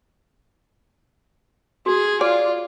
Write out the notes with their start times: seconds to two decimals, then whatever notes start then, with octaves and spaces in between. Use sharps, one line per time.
1.86 F#4 G#4
2.21 F4 D5